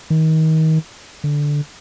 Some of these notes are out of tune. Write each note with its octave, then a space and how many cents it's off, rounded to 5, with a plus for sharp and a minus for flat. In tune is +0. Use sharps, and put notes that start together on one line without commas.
D#3 +30
D3 -5